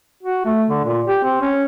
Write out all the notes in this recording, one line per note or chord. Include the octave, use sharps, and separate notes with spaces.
F#4
A3
D3
A#2
G4
C4
C#4